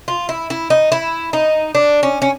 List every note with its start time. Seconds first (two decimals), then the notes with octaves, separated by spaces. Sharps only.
0.08 F4
0.29 E4
0.50 E4
0.70 D#4
0.92 E4
1.33 D#4
1.75 D4
2.03 C#4
2.22 C#4